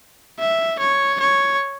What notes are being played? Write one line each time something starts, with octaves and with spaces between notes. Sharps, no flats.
E5
C#5
C#5